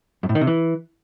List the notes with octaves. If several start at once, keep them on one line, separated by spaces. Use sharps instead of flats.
F#2
A2
D#3
C3
E3